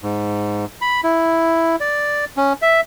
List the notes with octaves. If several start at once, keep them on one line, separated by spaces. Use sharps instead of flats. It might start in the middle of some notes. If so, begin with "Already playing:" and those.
G#2
B5
E4
D5
C#4
E5